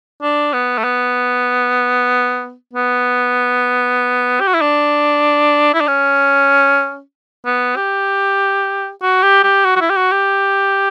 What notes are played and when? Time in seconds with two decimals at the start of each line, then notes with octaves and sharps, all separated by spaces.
0.22 D4
0.53 B3
0.78 A3
0.84 B3
2.73 B3
4.41 G4
4.47 F#4
4.54 E4
4.61 D4
5.74 E4
5.81 D4
5.88 C#4
7.46 B3
7.76 G4
9.02 F#4
9.23 G4
9.44 G4
9.65 F#4
9.76 F#4
9.81 E4
9.90 G4
9.97 F#4
10.12 G4